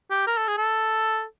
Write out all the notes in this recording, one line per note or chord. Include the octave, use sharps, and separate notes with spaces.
G4
A#4
A4
G#4
A4